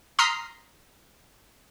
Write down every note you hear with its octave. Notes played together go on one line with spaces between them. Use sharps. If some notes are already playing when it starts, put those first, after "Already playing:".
A#5 C6 D#6 F6 B6 C7